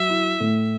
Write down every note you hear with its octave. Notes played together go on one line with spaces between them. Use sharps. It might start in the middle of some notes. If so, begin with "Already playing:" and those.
Already playing: F#3 E5
E4
A2